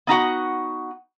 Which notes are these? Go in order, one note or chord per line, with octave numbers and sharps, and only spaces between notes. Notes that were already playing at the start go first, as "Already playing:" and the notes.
B3 D#4 F#4 F#5